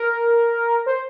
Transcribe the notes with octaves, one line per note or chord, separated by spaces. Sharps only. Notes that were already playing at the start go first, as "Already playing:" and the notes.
Already playing: A#4
C5